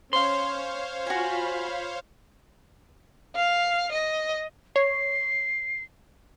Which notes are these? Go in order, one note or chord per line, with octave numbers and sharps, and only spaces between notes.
C#4 C5 C#5 F5 C6
F4 F#4 G#5 B5
F5
D#5
C#5 C7